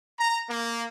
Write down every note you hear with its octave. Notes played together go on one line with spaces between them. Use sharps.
A#5
A#3